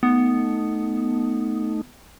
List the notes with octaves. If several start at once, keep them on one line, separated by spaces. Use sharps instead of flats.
A3 B3 D#4